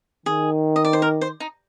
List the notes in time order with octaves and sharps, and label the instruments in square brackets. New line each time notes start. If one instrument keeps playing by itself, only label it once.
[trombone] D#3 [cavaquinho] G#4
[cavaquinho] D#5
D5
C5
A#4
C5
D#4